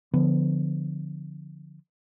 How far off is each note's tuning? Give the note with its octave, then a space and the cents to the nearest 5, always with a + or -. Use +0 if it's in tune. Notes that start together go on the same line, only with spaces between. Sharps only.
D3 +0 F3 +0 B3 +20